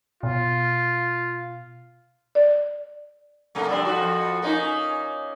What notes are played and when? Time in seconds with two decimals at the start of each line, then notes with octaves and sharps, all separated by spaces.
0.23 B2 F4
2.35 D5
3.55 C3 A3 A#3
3.69 G3 C4 D4
3.85 F2 F3 F#4
4.42 A#3 C#4 D#4